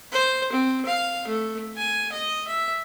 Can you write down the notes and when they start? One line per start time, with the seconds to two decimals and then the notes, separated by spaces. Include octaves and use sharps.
0.12 C5
0.52 C4
0.85 F5
1.27 A3
1.76 G#5
2.12 D#5
2.47 E5